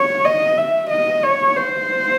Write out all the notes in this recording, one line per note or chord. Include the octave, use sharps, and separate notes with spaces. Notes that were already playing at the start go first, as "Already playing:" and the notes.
Already playing: C#5
D#5
E5
D#5
C#5
C5